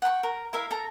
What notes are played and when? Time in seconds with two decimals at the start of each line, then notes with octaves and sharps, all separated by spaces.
0.02 F#5 G5 B5 C#6
0.23 A#4
0.53 E4 A#4 E5 F5
0.71 A4 A#5